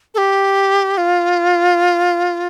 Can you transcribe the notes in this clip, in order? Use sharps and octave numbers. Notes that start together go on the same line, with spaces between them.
A4
G4
F4